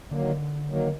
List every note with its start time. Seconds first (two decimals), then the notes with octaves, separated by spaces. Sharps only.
0.11 D3 D#3 F#3 A#3
0.69 D#3 F#3 A#3